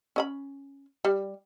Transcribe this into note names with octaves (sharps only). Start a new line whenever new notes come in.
C#4 D#5 B5
G3